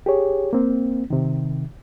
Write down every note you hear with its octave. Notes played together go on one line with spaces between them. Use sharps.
G4 G#4 C#5
A#3 C4
C3 D#3